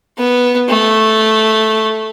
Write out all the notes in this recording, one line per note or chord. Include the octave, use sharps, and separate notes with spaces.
B3
A3